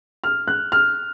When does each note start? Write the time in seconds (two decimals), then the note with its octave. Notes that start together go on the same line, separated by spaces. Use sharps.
0.24 F6
0.47 F#6
0.72 F6